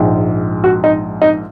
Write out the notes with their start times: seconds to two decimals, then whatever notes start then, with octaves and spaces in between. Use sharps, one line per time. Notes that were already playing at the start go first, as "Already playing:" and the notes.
Already playing: A#1 G#2 G#3
0.64 F#4
0.84 D#4
1.22 D#4